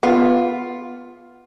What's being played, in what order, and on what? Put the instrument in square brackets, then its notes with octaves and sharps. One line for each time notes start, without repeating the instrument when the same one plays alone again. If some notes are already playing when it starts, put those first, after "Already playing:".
[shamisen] B3 [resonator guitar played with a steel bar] F4